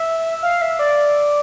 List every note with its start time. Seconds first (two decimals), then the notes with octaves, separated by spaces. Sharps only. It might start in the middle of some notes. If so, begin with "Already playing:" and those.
Already playing: E5
0.42 F5
0.62 E5
0.79 D5